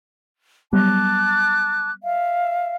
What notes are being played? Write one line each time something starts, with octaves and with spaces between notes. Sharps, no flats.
F#3 G3 B3 A5 D6 F#6
E5 F5